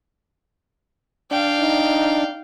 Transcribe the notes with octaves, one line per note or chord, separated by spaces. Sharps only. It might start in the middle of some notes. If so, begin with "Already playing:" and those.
D4 F5 G5
D#4